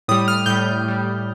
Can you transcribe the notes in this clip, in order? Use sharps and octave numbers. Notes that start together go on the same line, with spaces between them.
A2 G3 D#6
F6
A2 G3 G6
A2 G3